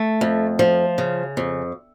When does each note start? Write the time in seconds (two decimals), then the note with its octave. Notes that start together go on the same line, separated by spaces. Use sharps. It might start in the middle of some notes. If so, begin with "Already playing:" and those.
Already playing: A3
0.21 F2
0.59 F3
0.98 C#3
1.37 F2